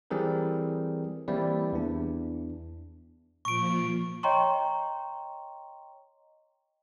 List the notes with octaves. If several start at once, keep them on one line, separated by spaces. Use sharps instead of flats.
E3 G3 C4 G#4 A#4
E3 G3 A#3 C4 E4 D5
E2 E3 D4
A#2 F3 C#6 D7
C#5 D#5 G5 A#5 C6 C#6